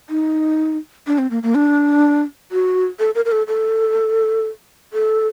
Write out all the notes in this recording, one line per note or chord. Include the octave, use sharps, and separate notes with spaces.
D#4
D4
C4
A#3
A#3
D4
F#4
A4
A#4
A#4
A4
A4
A4